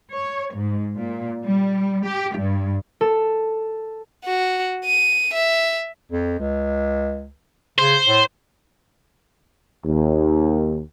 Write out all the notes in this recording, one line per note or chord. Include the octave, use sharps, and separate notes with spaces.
C#5
G#2
A#2
G3
G4
G2
A4
F#4
D#7
E5
F2
C#2
C#3 C5
A2
D#2